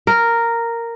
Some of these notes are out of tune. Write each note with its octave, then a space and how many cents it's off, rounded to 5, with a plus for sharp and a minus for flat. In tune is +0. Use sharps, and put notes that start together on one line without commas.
A#4 -5